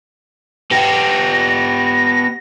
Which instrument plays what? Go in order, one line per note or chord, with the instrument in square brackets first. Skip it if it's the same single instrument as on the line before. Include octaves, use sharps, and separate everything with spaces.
[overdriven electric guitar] B3 G4 [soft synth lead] A#6